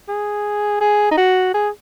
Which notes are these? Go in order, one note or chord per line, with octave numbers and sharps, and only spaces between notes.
G#4
G#4
D#4
F#4
G#4